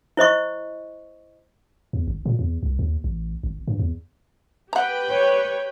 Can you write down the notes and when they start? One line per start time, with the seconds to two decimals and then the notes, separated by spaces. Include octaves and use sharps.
0.17 E4 C5 D#5 C#6
1.93 E2
2.07 G#1
2.26 A#2
2.39 E2
2.63 C2
2.79 D#2
3.04 A1
3.43 G#1
3.68 G2
3.79 E2
4.73 G4 B4 F#5 G5 A#5
5.08 C#5